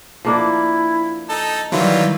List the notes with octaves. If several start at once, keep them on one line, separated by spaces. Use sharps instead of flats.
F3 A#3 D4 E4
D#4 A4
D#3 E3 F#3 G3 E4 F4